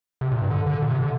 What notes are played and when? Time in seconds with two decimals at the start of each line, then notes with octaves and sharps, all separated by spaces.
0.21 C3
0.32 A#2
0.41 G2
0.51 D3
0.66 D3
0.82 A#2
0.91 C3
1.02 D3